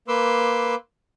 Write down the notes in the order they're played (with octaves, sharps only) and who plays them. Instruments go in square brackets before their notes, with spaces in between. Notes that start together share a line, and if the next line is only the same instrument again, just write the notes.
[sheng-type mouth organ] A#3 B4 C6 D6 E6